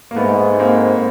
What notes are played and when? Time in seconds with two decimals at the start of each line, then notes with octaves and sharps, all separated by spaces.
0.11 A#3
0.16 G#2 A3 B3
0.59 A#3 C4